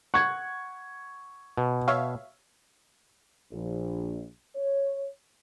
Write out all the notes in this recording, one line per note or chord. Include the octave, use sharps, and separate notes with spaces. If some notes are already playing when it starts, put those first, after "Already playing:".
F#5 C#6 G#6
B2
C#5 E5 F5
A#1
C#5